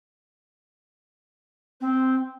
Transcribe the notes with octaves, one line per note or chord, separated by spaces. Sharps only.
C4